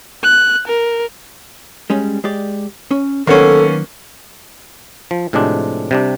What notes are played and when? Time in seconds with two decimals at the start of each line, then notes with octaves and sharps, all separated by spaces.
0.24 F#6
0.68 A#4
1.90 G3 G#3 C#4
2.24 G#3 G4 D5
2.91 C#4
3.27 D#3 F#3 A#3 B3 C#4 A4
5.11 F3
5.33 A2 C3 F3 G#3 D4
5.91 C3 G3 D4